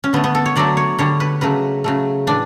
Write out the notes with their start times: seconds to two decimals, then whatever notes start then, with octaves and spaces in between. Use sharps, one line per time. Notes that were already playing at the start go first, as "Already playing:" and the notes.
0.04 C#4
0.13 D3 A3 B3
0.24 B3
0.35 A4
0.46 C#5
0.56 D3 F#3 A3 D5
0.77 C#5
0.99 D3 G3 C#5
1.20 B4
1.41 C#3 F#3 A3 B4
1.84 C#3 F#3 A3
2.27 A2 E3 D4